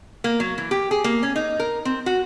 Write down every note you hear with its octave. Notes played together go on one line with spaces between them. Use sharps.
A#3
F#3
E3
G4
G#4
A#3
C#4
D#4
A#4
C4
F#4